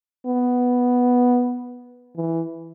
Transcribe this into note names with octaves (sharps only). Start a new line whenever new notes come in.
B3
E3